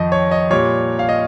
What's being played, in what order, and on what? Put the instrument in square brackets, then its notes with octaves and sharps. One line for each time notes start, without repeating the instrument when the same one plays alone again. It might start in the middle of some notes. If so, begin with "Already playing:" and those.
Already playing: [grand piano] F2 D#3 D#5
C#5
D#5
A#2 G3 C#5
F5
D#5